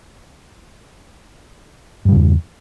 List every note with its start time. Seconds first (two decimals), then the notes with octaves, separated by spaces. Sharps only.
2.05 G2
2.08 G3
2.12 C#3
2.15 E2